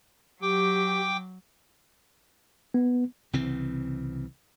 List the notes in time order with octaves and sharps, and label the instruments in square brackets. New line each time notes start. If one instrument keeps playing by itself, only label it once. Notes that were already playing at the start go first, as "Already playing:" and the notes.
[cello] F#3 [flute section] G4 [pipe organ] G5 D6
[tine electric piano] B3
[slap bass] C2 C#3 E3 C4